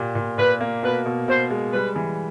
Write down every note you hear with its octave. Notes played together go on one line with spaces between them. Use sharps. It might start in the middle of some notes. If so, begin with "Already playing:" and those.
Already playing: A#2 G4
A#2
A#2 B4
A#3
B2 B4
B2
B2 C5
G#3
G3 B4
E3